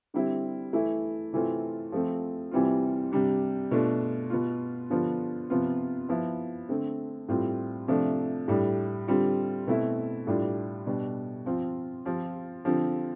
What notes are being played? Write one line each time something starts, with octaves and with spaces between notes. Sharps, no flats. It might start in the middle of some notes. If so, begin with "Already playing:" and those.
D3 G3 C4 E4
E3 A3 E4
C3 E3 A3 C4 F4
F3 A3 C4
C3 E3 G3 C4 F4
C3 G3 D4
B2 A3 D4 F4
B2 B3 F4
D3 F3 B3 D4 F4
C3 F3 B3 F4
F3 B3 E4
D3 A3 C4
A2 G3 C4 F4
C3 F3 A3 D4
A2 G3 D4
D3 G3 C4 F4
B2 A3 C4 E4
A2 G3 D4 F4
B2 G3 D4
F3 C4 F4
F3 C4 F4
D3 F3 C4 F4